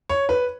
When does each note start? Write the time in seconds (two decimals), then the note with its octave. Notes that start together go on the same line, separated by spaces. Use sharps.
0.09 C#5
0.29 B4